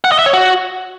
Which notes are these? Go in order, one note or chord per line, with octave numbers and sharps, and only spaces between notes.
F#5
D#5
E5
C#5
F#4